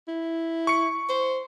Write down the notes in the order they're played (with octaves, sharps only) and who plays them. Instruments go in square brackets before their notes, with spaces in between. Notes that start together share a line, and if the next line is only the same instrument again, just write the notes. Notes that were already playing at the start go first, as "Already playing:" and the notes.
[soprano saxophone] E4
[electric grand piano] C#6 C#7
[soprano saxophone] C5